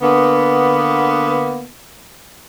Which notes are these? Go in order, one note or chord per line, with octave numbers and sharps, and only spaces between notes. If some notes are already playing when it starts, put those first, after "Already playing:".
D3 A#3 B3